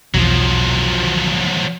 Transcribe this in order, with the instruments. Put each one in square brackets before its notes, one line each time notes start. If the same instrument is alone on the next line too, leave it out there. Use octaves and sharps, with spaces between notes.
[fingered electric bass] B1 E2 [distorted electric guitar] F3 F#3